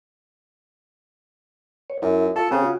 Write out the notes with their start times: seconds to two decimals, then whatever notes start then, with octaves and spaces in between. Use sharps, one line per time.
1.90 C#5
2.02 F#2 E4
2.36 F4 A4 C#6
2.51 C#3 C4 G4 G#4
2.63 F4 F#4